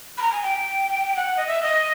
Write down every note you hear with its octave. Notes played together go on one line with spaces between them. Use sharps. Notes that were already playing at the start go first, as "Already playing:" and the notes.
B5
A#5
G#5
G5
F#5
D#5
E5
D#5